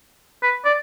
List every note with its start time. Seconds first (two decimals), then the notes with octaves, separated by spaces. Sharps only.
0.43 B4
0.65 D5